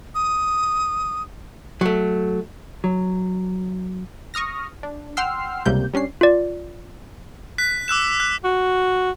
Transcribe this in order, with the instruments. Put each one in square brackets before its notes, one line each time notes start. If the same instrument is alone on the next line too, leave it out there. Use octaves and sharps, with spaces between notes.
[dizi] D#6
[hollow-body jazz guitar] F#3 A3
F#3
[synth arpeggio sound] C#6 D#6 F6 A#6
D4
F#5 G5 C6 E6 F6 C7
C#2 C3 G3 A#3 G6
G3 C#4 D4 C7
[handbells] F4 D5
[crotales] F#6 B6
D6 E6 F#6 E7
F#6
[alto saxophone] F#4